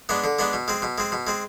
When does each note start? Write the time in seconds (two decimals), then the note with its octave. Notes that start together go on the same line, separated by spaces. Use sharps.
0.09 G#3 B3 D4
0.24 D3
0.39 G#3 B3 D4
0.53 B2
0.68 G#3 C4
0.82 B2
0.98 G#3 C4
1.12 B2
1.27 G#3 C4